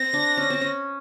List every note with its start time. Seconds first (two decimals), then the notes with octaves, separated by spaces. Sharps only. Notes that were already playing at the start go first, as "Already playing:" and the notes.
Already playing: C4 A#6
0.14 D4
0.37 C#4
0.50 C4
0.61 C#4